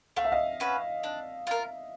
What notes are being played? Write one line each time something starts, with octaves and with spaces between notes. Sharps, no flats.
A3 F5
E5
D#5 F5
C#4 F#4 B4
D4
F4 A#4